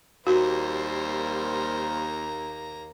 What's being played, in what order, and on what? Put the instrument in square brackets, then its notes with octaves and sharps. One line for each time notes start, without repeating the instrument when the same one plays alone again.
[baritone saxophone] D#2 [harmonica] G3 C5 [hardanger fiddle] A#3 A#5 [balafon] F#4